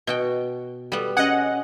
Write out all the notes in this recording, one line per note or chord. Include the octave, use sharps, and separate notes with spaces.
B2 F#4 G5
G3 B3 A4
C#4 G#4 D#5 F#5